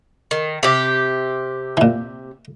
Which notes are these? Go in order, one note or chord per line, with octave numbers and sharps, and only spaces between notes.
D#3
C3 G4
A#2 E3